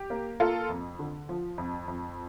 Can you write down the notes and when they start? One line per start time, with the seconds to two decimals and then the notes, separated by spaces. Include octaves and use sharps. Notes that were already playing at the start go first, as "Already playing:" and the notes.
Already playing: G4
0.10 A#3
0.40 A#3 F4 A4
0.69 F2
0.99 D3
1.29 F3
1.58 F2
1.88 F2